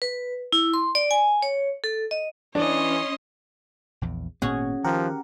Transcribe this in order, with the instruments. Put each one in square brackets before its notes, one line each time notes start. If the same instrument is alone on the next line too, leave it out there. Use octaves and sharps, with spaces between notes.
[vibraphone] B4
E4
C6
D5
G#5
C#5
A4
D#5
[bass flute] E3 [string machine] C#4 C6 [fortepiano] D4 [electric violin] C#5 D#5
[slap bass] A#1 E2
[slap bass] G#1 A#2 B3 [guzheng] C#4 F#4 G#4
[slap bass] D#3 [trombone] F3 [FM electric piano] G4 A#4 F#5